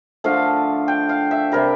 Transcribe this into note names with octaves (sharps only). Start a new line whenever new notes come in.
D3 F3 A3 F5
G5
F5
E5
C3 G3 A#4